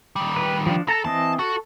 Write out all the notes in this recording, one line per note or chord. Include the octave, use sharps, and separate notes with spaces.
D#3 G3
B4
F3 D4
A4 A5 A#5
E3 C4 D#5 A5
F#4 A4